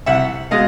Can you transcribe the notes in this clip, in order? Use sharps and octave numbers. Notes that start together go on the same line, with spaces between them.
C2 E5 F#5
B2 G#3 D#5 F5